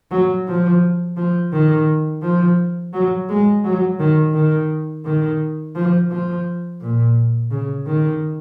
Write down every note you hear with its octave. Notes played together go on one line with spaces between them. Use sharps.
F#3
F3
F3
D#3
F3
F#3
G#3
F#3
D#3
D#3
D#3
F3
F3
A#2
C#3
D#3